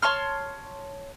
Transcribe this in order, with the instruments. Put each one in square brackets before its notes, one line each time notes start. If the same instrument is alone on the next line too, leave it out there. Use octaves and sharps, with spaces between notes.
[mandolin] C#5 A5 C6 F6